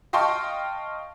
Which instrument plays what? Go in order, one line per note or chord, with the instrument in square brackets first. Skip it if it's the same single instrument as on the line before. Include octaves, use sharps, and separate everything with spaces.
[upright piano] D#5 F5 G5 A5 C6 C#6